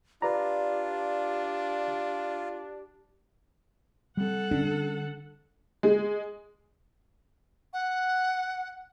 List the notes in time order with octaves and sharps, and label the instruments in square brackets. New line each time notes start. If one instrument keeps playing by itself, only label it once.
[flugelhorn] D4 [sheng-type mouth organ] F4 [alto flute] G4 [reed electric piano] B4 D5 A#5
[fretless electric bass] G3 C4 [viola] A4 F#5
[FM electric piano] D3 [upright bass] C#4
[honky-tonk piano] G#3
[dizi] F#5